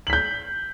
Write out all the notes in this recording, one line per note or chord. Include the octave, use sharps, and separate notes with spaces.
G6 B6 F#7